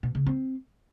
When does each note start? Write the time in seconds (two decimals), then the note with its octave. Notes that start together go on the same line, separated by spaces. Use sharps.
0.03 B2
0.15 C#3
0.27 C4